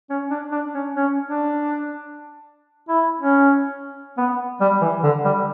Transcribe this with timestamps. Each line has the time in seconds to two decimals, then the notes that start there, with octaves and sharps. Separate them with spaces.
0.10 C#4
0.31 D4
0.52 D4
0.74 C#4
0.96 C#4
1.28 D4
2.89 E4
3.21 C#4
4.18 B3
4.61 G3
4.81 E3
5.03 D3
5.25 G3